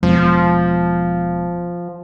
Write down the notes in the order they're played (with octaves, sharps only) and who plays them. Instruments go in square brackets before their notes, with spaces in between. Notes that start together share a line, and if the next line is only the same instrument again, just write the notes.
[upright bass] E1 [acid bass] F3